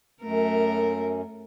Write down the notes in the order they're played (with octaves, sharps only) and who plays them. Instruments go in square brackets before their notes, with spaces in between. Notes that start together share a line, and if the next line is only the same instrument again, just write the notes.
[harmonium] F#2 [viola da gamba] A3 A#4